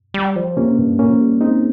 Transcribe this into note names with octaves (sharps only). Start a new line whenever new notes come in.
G3
F3
C3 A#3 C#4
G2
A#2 A#3 C#4
F3
G3
G#3 C4 D#4